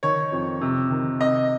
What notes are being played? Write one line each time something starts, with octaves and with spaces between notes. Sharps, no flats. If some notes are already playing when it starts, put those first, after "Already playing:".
D#3 C#5
F2
C3
D#3
C3 D#5